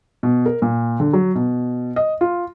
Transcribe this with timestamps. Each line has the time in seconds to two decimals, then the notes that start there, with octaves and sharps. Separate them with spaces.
0.23 B2
0.46 A#4
0.62 A#2
1.00 D3
1.13 F#3
1.35 B2
1.96 D#5
2.21 F4